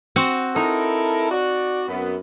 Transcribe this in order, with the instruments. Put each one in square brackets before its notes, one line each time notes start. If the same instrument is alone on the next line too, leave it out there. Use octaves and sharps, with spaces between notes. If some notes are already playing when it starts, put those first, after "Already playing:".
[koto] C4 F#4
[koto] D#4 [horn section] E4 A4 A#4
[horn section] F#4 D5
F#2 B3